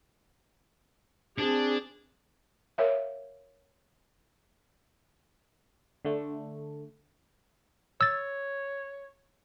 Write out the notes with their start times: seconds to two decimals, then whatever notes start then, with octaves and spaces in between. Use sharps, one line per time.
1.38 C4 D4 G#4
2.78 A#4 C#5 E5 F5
6.05 D3 A3
8.01 C#5 E6 A6